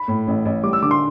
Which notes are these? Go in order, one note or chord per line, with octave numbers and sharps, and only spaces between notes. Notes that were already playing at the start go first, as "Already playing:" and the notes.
Already playing: B5
A2
A1
A1
G3 D6
E6
D3 D6
C6